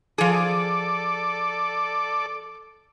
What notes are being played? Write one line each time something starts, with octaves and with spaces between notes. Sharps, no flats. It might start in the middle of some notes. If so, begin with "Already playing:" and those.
F3 G#4 A4 D5 D6